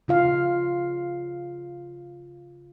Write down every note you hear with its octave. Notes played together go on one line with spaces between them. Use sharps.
C#3 F4 F5